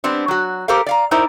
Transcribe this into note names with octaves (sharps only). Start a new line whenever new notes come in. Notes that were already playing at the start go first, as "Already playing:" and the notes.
G3 B3 C4 D4
F#3 F#4
G4 A4 A#4 C5 F5
D5 F5 A#5
D#4 E4 A#4 C5 D5